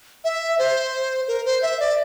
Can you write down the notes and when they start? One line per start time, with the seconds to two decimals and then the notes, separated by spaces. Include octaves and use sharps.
0.24 E5
0.59 C5
1.28 A#4
1.45 C5
1.62 E5
1.80 D5